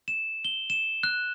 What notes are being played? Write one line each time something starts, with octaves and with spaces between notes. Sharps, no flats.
E7
G7
E7
F#6